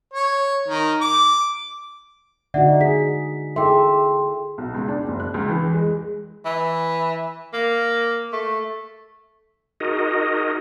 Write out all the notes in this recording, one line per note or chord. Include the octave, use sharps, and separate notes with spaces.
C#5
D#3
D6
D3 D#4 F#4 D5 E5 F#5
G#4 B6
E4 G#4 A4 E5 G5 C6
B1
C#2
D4
F#1
F#6
C#2
E3
G#3
E3
A#3
A3
D#4 F#4 G#4 A#4 D#5